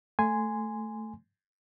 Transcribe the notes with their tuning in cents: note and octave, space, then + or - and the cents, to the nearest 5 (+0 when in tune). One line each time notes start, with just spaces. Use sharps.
A3 +0 G#5 +0 C6 -15